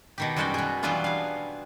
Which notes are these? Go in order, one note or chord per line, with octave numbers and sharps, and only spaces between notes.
B2 D#3 G4
F#2 G3 G#3 F#4 D5 G5
B2 G#4
E3 F#3 G3 B3 D4 F4
G#4 F5